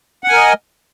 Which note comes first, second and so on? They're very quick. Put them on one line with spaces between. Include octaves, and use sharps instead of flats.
F#5 G#5 A#4 D#5